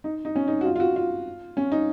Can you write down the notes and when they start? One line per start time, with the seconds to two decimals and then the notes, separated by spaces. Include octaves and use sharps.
0.04 D#4
0.25 D#4
0.35 C#4
0.48 D#4
0.61 F#4
0.65 F4
0.76 F4
0.80 F#4
0.96 F4
1.57 C#4
1.72 D#4